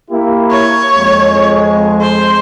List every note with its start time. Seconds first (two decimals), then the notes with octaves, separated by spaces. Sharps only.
0.11 A#3 E4 G4
0.51 C#5
0.96 F2 G#3
2.01 C5